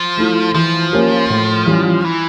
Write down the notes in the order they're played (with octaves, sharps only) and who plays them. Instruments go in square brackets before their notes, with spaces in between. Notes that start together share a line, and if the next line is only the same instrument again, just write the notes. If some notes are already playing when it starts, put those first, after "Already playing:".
Already playing: [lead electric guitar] F3
[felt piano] A3 E4
[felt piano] E3 [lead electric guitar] F3
[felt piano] A#3 C#4 G4 A#4
A2
E3 G3 C#4 F4
[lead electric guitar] E3